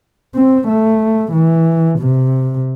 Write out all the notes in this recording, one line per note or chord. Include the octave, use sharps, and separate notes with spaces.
C4
A3
E3
C3